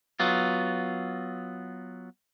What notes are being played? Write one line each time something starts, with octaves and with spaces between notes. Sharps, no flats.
F#3 B3 F4